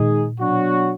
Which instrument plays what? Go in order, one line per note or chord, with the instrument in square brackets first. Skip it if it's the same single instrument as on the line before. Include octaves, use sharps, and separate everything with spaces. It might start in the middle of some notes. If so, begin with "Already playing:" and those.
Already playing: [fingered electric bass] A#2 [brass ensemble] D#3 G#3 D#4 G#4
[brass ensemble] B2 F#3 D4 F#4